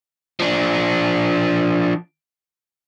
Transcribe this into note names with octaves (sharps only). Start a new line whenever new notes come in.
F3 D4